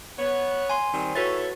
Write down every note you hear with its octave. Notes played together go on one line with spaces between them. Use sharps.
B3 C#5
G#5 C6
D#3 G3 C4
E4 F#4 A4 B4 C#5 A6